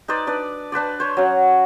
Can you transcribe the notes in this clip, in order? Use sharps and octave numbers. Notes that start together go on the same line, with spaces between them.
D#4 B4 C5 D5
D4 B4 D5
D4 B4 C5 D5
C5 C#5
F#3 C#4 F#5